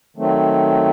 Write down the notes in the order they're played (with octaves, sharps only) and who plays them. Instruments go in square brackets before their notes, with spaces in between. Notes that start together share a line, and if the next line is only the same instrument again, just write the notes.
[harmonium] D#3 F#3 A3 C4